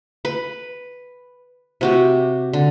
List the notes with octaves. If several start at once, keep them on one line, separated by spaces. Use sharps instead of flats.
B4
C3 F#4 G4
D3